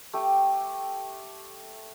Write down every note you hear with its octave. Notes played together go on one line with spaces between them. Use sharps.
A3 G4